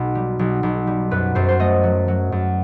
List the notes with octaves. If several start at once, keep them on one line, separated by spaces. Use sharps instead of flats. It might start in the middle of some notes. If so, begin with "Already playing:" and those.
Already playing: B1 B2
G3
B1
B1
G3
F#2 B4
F#2 C5
C5
A3 D#5
F#3
F#3
F#2